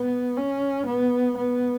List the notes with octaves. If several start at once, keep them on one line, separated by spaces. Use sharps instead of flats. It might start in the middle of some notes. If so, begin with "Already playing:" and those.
Already playing: B3
C#4
B3
B3